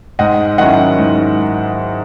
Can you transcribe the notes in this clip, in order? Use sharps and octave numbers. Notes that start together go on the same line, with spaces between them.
G#2 D#5 F#5
D#3 F#3 C#4 E4 D#5 F#5
G#2